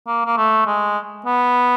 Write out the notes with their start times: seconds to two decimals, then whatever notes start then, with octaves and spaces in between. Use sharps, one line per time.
0.07 A#3
0.26 A#3
0.37 A3
0.67 G#3
1.26 B3